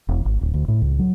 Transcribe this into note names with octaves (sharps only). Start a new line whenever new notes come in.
E1
G#1
D1
D2
A2
C#2
F#3